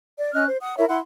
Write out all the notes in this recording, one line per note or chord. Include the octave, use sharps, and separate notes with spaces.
D5
C#4 D#5 F6 F#6
C5
F#5 D#6
E4 A#4 C#5 E5
E4 F#5 C6